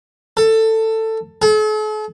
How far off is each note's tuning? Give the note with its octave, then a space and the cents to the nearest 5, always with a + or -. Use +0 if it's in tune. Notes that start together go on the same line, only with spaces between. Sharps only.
A4 +15
A4 -45